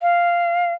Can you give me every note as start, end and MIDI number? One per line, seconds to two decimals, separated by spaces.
0.02 0.74 77